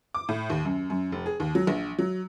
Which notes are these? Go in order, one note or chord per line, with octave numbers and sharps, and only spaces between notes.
D6
A2
D#2
F#2
F#2
F1
G#4
D#2
F#3
A#1
F#3